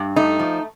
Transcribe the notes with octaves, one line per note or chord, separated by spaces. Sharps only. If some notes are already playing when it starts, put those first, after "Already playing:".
Already playing: G2
A3 D#4
F3